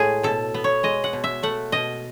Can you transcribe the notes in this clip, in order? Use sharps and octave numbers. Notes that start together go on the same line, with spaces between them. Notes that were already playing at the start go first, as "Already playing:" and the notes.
Already playing: A2 G#3 G#4
B2 A4
B3
C#5
G#3 D#5
F#5
B2
E5
A3 F#5
B2 D#5